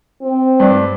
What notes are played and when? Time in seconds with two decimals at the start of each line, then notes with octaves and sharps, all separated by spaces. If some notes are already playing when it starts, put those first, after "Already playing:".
0.22 C4
0.60 G2 D4